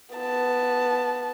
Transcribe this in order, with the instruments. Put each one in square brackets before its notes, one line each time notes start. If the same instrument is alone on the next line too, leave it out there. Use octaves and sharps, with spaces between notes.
[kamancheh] B3 A5